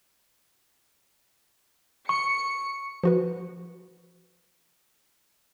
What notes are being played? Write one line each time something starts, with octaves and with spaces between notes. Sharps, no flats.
C#6 C#7
F3 F#4 B4